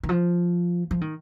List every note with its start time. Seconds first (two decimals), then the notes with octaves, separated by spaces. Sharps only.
0.04 D#3
0.09 F3
0.91 F3
1.01 D#3